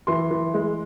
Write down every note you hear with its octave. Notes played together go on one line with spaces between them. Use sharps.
E3 C6
E3
G#3